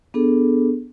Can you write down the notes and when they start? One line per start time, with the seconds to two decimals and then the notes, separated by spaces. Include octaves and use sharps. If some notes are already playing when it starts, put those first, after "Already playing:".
0.14 B3 D4 G#4 A4